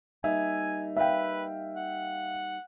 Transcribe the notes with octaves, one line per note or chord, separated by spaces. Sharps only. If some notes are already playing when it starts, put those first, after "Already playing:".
G3 A#3 D#4 E5 G#5
B4 E5 F5 G5
F#5